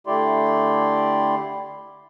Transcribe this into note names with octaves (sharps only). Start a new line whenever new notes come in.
D3 A3 E4 G4 D5 C6